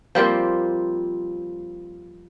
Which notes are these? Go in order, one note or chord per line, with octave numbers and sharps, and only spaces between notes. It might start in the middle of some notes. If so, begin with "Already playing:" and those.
F3 G3 A#3 C4